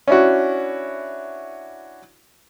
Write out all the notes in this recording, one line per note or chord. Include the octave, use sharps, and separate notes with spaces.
C#4 D4 E4 F#4